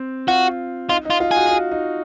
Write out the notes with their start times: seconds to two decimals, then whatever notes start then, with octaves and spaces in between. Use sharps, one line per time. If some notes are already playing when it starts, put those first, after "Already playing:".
Already playing: C4
0.28 F4 F#4
0.89 D#4 F4
1.05 D#4
1.10 F4
1.20 F4
1.31 F#4 G#4
1.46 F#4
1.51 F4
1.71 D#4